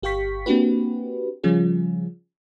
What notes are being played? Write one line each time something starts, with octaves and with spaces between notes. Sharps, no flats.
G1 G4 F5 G5 C#6 B6
A#3 C4 D4 F#4 G4 B4
C#3 F3 G3 C#4 F4 G#4